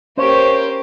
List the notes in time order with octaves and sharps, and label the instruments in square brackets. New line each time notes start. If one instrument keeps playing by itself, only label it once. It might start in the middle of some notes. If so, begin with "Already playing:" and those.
[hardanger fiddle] A#3 G4 [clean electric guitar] C#4 C#5 [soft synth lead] C5